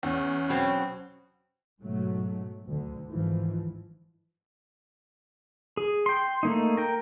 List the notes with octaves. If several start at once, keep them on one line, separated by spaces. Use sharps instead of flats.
E2 C#4
B2 F#3 C4
G#2 B2 F#3 A3
D2 D3
G#1 G#2 E3 F3
G#4
G5 C6
A3 A#3 D#4
A#4 G5